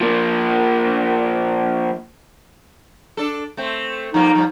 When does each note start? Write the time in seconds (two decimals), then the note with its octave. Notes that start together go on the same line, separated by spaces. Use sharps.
0.01 F3 A#3
3.17 D4 A4
3.57 A3 C4
4.14 F3 G3 A#3 D#4
4.35 F3 G3